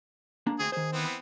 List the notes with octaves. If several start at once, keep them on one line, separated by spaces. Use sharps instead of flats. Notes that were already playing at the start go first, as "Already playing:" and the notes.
A#3 D4 A#5
D2 C4 G#4
D#3 G#4 C5
E3 B3 C4